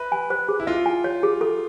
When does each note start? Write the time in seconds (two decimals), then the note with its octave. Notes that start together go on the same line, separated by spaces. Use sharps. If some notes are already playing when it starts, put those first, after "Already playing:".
Already playing: B4 E5
0.12 G#5
0.30 C5
0.49 G#4
0.60 E4
0.67 F4 E5
0.86 G#5
1.04 C#5
1.23 G#4
1.41 A4